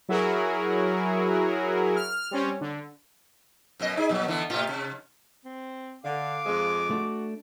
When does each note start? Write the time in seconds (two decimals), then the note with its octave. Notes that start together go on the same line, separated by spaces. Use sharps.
0.09 F#3 E4 F#4 G#4 A#4
1.96 F6
2.31 G3 C4 C#4
2.61 D3
3.80 F#2 B2 D#5
3.97 D#4 G#4
4.09 A#2 F#3
4.26 D3 E3 B3
4.50 A2 C3 F4
4.69 C3
5.45 C4
6.04 D3 F5 D6
6.45 F2 F3 G#3
6.90 A3 D4 F#4